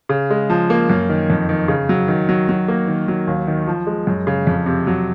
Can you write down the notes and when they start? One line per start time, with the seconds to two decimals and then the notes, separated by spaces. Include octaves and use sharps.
0.09 C#3
0.30 G#3
0.50 F3
0.70 A#3
0.90 F#2
1.09 D#3
1.30 F2
1.49 D#3
1.68 C#3
1.89 F#3
2.08 D#3
2.29 F#3
2.49 F#3
2.68 A#3
2.88 D#3
3.08 F#3
3.27 D#2
3.48 D#3
3.67 F3
3.87 G#3
4.07 F#2
4.27 C#3
4.47 F2
4.66 C3
4.87 F#3